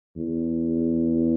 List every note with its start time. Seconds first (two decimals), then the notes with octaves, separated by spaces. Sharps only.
0.17 E2